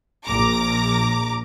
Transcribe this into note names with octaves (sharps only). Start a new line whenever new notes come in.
A#1 A#5 D6